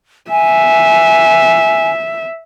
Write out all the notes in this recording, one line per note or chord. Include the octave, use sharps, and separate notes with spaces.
E5 G#5